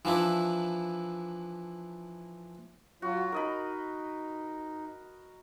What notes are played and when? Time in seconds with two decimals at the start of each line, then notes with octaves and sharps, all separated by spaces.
0.05 E3 F3 D4 E4
3.02 F#3 F4 F#4
3.32 D#4 A#4 D#5 B5